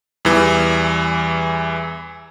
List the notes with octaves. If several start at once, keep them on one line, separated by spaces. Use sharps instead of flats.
E2 E3 G3